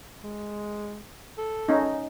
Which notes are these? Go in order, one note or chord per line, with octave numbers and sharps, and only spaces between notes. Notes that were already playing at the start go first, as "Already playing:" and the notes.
G#3
A4
C#4 D#4